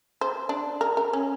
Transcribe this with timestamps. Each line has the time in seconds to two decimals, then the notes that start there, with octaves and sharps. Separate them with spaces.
0.21 C5
0.49 D4
0.81 A#4
0.97 A#4
1.13 C#4